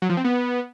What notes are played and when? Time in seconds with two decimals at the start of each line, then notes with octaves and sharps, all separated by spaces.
0.02 F#3
0.09 F3
0.17 C4
0.24 B3